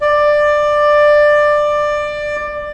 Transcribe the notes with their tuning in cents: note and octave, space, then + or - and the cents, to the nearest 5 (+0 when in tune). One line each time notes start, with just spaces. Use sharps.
D5 +15